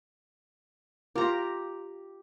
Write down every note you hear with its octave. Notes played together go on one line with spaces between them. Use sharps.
F4 G4 A#4 A#5